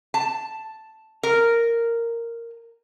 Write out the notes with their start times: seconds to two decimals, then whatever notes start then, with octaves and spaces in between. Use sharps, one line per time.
0.14 A5
1.23 A#4